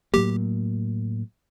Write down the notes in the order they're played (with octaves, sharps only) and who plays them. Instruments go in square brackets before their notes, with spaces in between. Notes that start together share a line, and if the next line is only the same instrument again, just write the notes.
[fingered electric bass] A2 F#3 A#3 [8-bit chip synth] G4